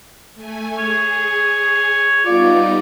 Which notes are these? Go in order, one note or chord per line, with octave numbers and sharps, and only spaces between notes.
A3 G#5
G#4 C#5
G3 B3 D#4 F4 D5